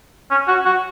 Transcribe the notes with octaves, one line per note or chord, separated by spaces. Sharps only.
C#4
F#4
F#4